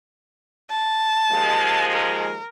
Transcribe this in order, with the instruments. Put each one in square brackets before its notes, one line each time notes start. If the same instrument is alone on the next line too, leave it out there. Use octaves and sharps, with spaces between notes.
[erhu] A5
[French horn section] D#2 F3 G#3
[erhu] A#4